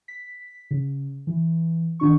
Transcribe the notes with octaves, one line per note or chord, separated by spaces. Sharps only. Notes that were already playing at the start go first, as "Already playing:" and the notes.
B6
C#3
E3
D#3 D4 C#6